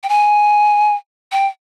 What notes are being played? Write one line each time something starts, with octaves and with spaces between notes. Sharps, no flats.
G5
G#5
G5